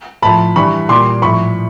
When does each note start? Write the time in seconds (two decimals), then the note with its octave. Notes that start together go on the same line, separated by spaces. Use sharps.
0.22 A2 F3 A5 B5
0.56 G2 E3 G3 B5 C#6
0.89 A#2 G3 C6 D6
1.22 A2 F3 B5 C#6